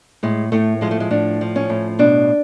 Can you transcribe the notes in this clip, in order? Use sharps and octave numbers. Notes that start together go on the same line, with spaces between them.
A2 G#3
A2 A3
F3 G#3
A3
G#3
A2 D4
F3
C#4
A2
B2 D4